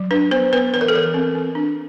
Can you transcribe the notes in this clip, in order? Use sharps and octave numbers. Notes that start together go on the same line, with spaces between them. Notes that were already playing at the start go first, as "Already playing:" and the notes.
Already playing: F#3
D4 B4
B3 C5
B3 B4
E3 B4
A#4
A4
E3 A#4
C4
C4
D4